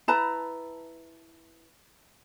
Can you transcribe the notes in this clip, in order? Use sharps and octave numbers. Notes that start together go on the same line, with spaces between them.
E4 B4 A5 A#5